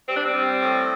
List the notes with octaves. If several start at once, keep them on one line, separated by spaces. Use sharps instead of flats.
G3 C4
D4
C4
G3
A2